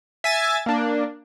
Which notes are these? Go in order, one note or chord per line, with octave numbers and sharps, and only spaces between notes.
E5 G#5 A6
A#3 D4